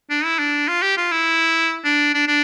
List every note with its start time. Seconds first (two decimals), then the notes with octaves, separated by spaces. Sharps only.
0.10 D4
0.25 E4
0.39 D4
0.68 F4
0.82 G4
0.97 F4
1.12 E4
1.84 D4
2.14 D4
2.28 D4